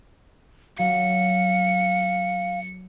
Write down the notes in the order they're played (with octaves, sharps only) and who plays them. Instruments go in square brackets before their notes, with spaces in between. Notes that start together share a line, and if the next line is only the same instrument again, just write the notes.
[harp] F#3 [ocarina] F5 [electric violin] C#7